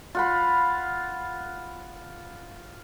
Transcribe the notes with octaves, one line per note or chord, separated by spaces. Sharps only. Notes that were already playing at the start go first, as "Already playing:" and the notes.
F4 F#5 B5